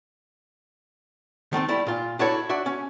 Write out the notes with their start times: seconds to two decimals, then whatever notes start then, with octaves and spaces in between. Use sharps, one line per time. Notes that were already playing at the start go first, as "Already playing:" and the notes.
1.53 D#3 A3 A#3 C4
1.68 G3 A3 E4
1.87 A#2 F4
2.19 D4 E4 F#4 A4 C#5
2.49 D4 F#4 E5
2.66 C#4